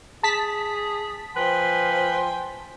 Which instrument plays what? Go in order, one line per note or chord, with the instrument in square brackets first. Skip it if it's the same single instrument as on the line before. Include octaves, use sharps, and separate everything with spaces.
[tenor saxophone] G#4 [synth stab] A5 B6
[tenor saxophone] F3 [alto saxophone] B4 [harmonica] G5 G#5 C6